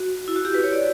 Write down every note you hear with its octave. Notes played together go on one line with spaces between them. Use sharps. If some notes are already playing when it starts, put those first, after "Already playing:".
Already playing: F#4
E4
F#4
G4
B4
C#5
D5